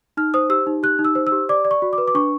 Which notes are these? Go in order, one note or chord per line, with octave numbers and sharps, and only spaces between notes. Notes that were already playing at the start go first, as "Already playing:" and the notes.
D#4 F6
C5 D#6
G4 E6
D#4
G4 F#6
D#4
E6
C5
E6
G4
D5 D6
D5
C#6
F#4
D6
B4
D6
D4 C#6